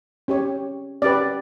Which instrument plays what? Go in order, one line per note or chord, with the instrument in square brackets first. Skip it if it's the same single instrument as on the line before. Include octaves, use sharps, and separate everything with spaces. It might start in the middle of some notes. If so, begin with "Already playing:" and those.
[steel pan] C#4 G4 C#5
C#4 G4 B4 D5